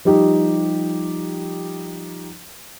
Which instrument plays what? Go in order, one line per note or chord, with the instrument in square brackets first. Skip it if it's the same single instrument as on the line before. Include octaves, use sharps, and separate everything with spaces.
[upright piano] F3 G3 D#4 G4